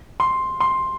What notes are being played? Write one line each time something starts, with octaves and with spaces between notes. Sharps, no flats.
C6
C6